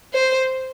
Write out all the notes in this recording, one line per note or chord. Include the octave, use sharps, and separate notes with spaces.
C5